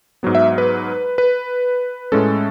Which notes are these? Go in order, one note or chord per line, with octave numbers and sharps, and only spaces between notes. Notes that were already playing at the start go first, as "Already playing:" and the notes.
G#2 F#3 B3
E5
B4
B4
A2 G#3 C#4 A4